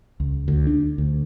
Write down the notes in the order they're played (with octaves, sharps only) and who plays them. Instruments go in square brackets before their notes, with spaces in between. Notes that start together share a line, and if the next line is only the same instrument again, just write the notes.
[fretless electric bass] C#2
D2
D4
D2